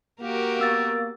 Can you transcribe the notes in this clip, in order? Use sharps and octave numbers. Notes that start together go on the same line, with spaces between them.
A#3 F#4 G4 A#4
B3 E6 A6